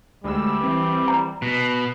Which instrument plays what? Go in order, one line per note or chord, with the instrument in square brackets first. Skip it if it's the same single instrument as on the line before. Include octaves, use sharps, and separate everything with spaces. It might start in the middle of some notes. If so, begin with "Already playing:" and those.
[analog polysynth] D2 G#3 E6 [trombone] G3
[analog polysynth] E3 C4
[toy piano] A#5
[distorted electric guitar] B2 [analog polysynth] F#6